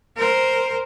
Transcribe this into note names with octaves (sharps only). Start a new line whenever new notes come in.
A#4 C5